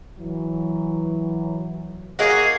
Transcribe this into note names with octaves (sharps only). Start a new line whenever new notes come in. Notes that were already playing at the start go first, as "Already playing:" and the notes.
E3 F#3
A#3 D#4 F#4 G#4